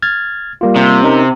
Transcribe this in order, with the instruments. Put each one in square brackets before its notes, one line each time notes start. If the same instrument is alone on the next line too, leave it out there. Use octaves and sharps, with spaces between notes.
[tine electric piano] F6 G#6 A6
G3 A#3 F4
[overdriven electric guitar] C3
[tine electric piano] C#4 D#4 A#4